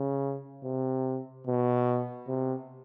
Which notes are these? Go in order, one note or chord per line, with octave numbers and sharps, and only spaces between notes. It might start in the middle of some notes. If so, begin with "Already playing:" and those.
Already playing: C#3
C3
B2
C3